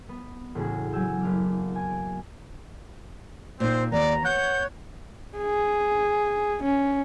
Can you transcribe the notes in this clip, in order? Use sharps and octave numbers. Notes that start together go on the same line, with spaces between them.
B3
E1 A2 C#3 F#4 G#4
F#3 G#5 E6 G6
F#1 F5 D6
G#5 D7
A#2 C4 D#4 C5
D#2 B3 D5 A#5
C#5 F#5 G6
G#4
C#4